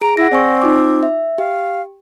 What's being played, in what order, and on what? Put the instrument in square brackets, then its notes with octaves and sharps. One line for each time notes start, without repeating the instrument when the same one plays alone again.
[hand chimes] G#4 D7 [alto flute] A#5
[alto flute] E4 [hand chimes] F#5 A#6
[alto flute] C4 [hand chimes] D5 G#5 C#6
[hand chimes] D#4 F4 D6
E5
[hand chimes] G4 [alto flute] F5